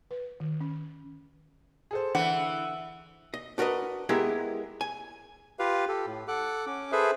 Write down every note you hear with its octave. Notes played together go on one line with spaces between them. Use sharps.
B4
D#3
C#4
G#4 A4 C5
D3 E3 F#5
D#5
D4 F#4 A#4 B4 D#5
G#3 B3 E4 G4 G#4 A#4
G#5
F4 G4 B4 F5
G4 A4
A2
A4 F#5 D6 F#6
C#4 D6
G#4 A4 B4 C5 E5